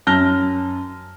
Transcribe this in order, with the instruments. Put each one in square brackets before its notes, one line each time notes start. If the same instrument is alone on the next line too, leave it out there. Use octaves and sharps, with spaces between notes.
[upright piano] F#2 A5 F6 A#6 G7